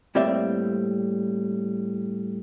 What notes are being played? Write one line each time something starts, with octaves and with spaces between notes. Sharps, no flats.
A2 G3 A#3 C4 D5 E5